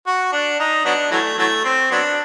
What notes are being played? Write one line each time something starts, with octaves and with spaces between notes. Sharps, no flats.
F#4
D4
D#4
F#3 B3 D4
E3 F#3 A3
E3 F#3 A3
C4
F#3 B3 D4